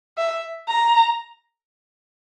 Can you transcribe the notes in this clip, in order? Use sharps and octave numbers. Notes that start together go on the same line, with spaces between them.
E5
A#5